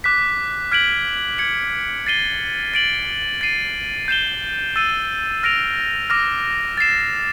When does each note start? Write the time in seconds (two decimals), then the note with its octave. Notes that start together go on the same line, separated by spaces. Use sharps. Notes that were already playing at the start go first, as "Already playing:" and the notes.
0.04 D6 F#6 B6
0.72 F6 G#6 B6 D7 F#7
1.38 G#6 C#7 F#7
2.07 A6 C7 D#7 G7
2.74 A6 D7 F#7
3.41 A6 C7 D#7
4.08 G6 C7 E7 G7
4.76 E6 A6 C7 D#7
5.43 F6 A#6 D7 F7
6.10 D6 F6 A#6
6.77 A6 C7 E7